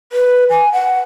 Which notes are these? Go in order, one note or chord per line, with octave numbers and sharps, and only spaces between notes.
B4
G#5
F#5